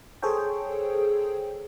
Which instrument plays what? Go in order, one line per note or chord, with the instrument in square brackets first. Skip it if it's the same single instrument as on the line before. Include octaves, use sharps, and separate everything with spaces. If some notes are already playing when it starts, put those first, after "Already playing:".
[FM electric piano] G#4 A4 C5 C#5 G5